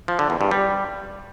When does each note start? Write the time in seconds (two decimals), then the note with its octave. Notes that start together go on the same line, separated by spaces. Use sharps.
0.08 F3
0.19 D3
0.30 E2
0.41 G2
0.51 G3